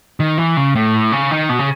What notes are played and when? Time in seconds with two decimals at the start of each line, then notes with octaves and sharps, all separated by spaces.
0.20 D#3
0.38 E3
0.57 C#3
0.75 A2
1.12 C#3
1.31 D#3
1.49 B2
1.59 C#3